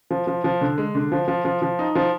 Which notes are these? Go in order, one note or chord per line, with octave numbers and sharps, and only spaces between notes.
F3
F3
F3
D3
G#3
D3
F3
F3
F3
F3
D#4
F3